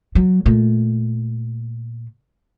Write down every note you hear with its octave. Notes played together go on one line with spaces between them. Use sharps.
F#3
A#2 A3